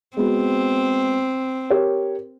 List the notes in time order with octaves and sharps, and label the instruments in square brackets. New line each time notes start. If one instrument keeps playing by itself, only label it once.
[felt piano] G#3 B3 F#4 [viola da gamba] C4
[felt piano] G4 A#4 C#5